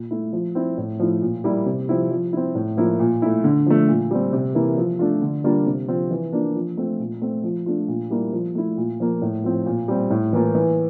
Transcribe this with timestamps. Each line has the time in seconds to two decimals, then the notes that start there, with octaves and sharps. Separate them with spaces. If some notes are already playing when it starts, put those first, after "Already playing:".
Already playing: A#2
0.11 A3 E4
0.33 F3
0.55 C4 E4
0.78 A2
0.99 F3 A3 E4
1.21 A#2
1.44 G3 A#3 E4
1.66 C3
1.89 F3 C4 E4
2.11 F3
2.33 C4 E4
2.55 A2
2.77 F3 A#3 E4
2.99 A#2
3.22 A3 E4
3.44 D3
3.66 F3 A3
3.88 A#2
4.11 G3 C4
4.33 C3
4.55 E3 A#3 E4
4.77 F3
4.99 A3 D4 F4
5.22 D3
5.44 G3 A#3 D4 F4
5.66 C3
5.88 F3 C4 F4
6.11 E3
6.33 A#3 D4 F4
6.55 F3
6.77 A3 C4 F4
7.00 A#2
7.22 A3 C4
7.44 F3
7.66 A3 D4 F4
7.88 A#2
8.10 G3 A#3 E4
8.33 F3
8.55 A3 E4
8.77 A#2
9.00 F3 A#3
9.22 A2
9.44 F3 C4
9.66 A#2
9.88 G3 C4
10.11 A2
10.33 E3 A#3 F4
10.55 E3